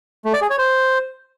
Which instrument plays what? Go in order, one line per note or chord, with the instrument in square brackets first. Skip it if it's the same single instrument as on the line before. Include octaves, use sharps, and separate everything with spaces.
[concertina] A3
D5
G#4
C#5
C5